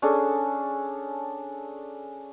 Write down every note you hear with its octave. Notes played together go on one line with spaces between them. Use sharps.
C#4 D4 G#4 A4